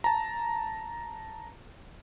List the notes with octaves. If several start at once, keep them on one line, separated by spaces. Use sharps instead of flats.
A5 A#5